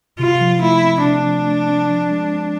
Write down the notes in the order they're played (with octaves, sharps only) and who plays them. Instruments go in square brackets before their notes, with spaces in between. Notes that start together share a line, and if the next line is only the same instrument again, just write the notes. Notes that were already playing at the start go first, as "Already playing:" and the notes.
[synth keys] C3 [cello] F4
[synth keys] F3
[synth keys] A3 [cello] E4
[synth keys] C4
[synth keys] C3 [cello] D4
[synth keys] F3
A3
C4
F3
G#3
C4